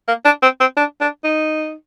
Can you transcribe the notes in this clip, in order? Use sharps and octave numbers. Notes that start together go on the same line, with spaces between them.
A#3
D4
C4
C4
D4
D4
D#4